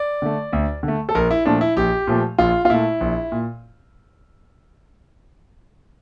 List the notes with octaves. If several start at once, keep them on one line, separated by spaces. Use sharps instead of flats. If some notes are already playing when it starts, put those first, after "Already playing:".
Already playing: D5
D3 A3
D2
D3
A3
A4
A#1 A#4
E4
A#2 F3 A3 D4
E4
A#1 G4
A#2 F3 A3
A#1 F4
F4
A#2 A3 E4
A#1
A#2